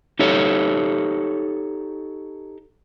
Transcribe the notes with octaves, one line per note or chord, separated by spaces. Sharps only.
D#4 G4 A4 C#5